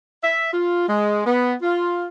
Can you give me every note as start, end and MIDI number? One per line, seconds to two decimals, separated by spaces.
0.22 0.48 76
0.53 0.85 65
0.87 1.22 56
1.25 1.55 59
1.62 2.05 65